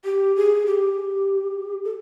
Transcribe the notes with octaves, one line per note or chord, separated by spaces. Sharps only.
G4
G#4
G4
A4